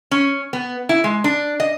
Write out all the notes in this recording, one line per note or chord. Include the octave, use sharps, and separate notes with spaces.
C#4
B3
E4
G#3
D4
D#5